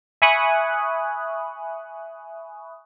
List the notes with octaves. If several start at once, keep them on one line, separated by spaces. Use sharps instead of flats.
E5 G#5 B5 C#6 D#6 F#6